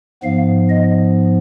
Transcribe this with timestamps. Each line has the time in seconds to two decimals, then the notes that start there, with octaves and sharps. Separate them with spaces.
0.23 G#2 F3 B3 F5
0.69 D#5